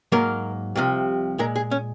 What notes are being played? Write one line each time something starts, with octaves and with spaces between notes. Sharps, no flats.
G#2 F#3 A#3 A#4
C2 C3 F3
A#2 G#3 A#4
G#4
C#4